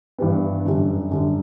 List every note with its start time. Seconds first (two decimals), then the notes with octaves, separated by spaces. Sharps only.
0.18 G2 E3 G3 B3
0.65 F#2 D3 G3
1.10 F#2 D3 G3